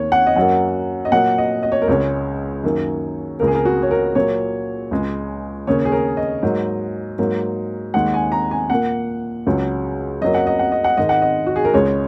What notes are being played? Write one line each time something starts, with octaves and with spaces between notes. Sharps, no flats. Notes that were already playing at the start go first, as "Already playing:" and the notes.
Already playing: D#2 D#3 A#3 C#5
F#5
D#5
F#2 F#3 A#3 F#5
D#5
A#2 F#3 A#3 F#5
D#5
D#5
C#5
A#4
C#2 C#3 G#3 C#5
F#2 D#3 A#3
C#2 C#3 A#3 A#4
G#4
A#4
F#4
C#5
A#4
A#2 F#3 A#3 C#5
C#2 C#3 G#3
D#2 C#3 A#3 C#5
G#4
A#4
D#5
G#2 F#3 A#3
G#2 F#3 A#3
D#2 D#3 G#3 F#5
G#5
A#5
G#5
A#2 A#3 F#5
C#2 C#3 F#3
F#2 F#3 A#3 D#5
F#5
D#5
F#5
D#5
F#5
G#2 D#3 G#3 D#5
F#5
D#5
F#4
G#4
A#4
C#2 C#3 G#3 C#5